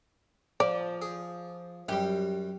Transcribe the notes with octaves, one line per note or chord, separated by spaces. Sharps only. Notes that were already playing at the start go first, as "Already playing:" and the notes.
F3 D5
G#4
F#2 G3 G4